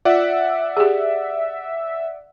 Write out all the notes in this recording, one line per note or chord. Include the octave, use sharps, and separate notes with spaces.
F4 D5 E5 F#5
G4 G#4